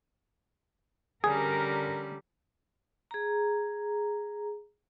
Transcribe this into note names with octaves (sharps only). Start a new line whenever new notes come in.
D3 G3 C#4 G#4 A#4
G#4 A#5